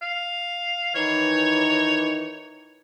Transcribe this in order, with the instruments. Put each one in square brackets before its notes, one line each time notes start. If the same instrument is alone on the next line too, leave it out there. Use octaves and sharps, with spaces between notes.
[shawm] F5
[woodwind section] D#3 E3 D#4 [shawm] C#5